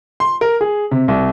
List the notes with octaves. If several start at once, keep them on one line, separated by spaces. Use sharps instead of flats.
C6
A#4
G#4
C3
C2